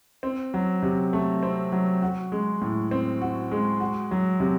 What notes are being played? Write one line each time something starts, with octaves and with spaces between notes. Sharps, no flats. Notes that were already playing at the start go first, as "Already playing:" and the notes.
C4
F#3
C3
A3
C4
F#3
F#4
G#3
A2
C4
F#4
G#3
F#4
F#3
C3